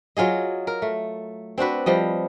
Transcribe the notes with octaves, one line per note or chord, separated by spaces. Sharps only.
F#3 F4 G#4 D#5
A#4
A3
C4 D4 F#4 B4
F3 G3 D#5